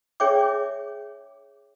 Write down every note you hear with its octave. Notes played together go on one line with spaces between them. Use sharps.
D4 G#4 C#5 E5 G5 D6